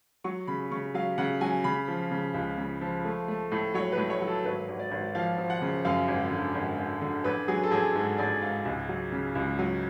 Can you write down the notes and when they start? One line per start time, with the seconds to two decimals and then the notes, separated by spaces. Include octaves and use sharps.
0.24 F#3 C#6
0.48 C#3 B5
0.71 C#3 C#6
0.94 F#3 F5
1.18 C#3 F#5
1.41 F#3 G#5
1.64 C#3 B5
1.88 F3
2.11 C#3
2.34 C#2
2.58 C#3
2.81 F3
3.04 A3
3.28 A3
3.51 A2
3.74 F#3 C#5
3.92 B4
3.97 A2
4.10 C#5
4.21 F#3
4.27 A4
4.45 G#1 B4
4.68 G#1
4.79 D5
4.91 G#1
5.15 F3 F5
5.38 F3
5.50 F#5
5.62 C#3
5.85 F#2 F5
6.08 G#1
6.31 D3
6.55 G#1
6.78 D3
7.01 D3
7.24 A1 B4
7.48 F#3 G#4
7.63 A4
7.71 A1 G#4
7.95 G#2 A4
8.18 A1 D5
8.42 G#2 F5
8.65 C#2
8.89 F#3
9.12 C#3
9.35 C#2
9.59 F#3